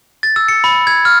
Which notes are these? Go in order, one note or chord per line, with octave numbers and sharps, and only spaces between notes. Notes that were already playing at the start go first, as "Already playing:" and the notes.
A6
E6
C#7
B5
G#6
F6